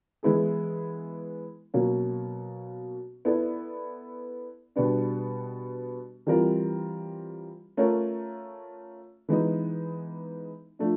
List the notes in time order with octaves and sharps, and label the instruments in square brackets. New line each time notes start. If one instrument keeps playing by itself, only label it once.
[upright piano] E3 G#3 B3 E4 G#4
B2 F#3 A#3 C#4
B3 E4 A4 D5
B2 G3 B3 D4
E3 G3 C4 F4 A#4
A3 C#4 F4 A#4 C#5
E3 G#3 B3 D#4
F3 A3 D4